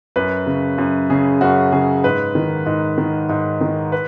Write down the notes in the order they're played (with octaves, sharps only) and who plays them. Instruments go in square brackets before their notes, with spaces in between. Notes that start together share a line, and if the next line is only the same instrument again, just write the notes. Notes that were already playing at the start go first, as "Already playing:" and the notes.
[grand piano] F#2 B4
C#3
F#2
C#3 G#4
F#2 F#4
C#3 G#4
G#2 B4
D#3
G#2
D#3
G#2
D#3
B4